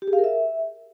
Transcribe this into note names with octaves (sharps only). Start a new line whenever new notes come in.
G4
G#4
F5
A#4
E5